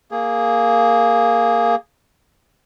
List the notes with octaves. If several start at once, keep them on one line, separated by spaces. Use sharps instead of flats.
A#3 G#4